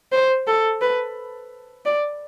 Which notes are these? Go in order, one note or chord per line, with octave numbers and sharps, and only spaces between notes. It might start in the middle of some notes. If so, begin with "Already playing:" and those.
C5
A4
B4
D5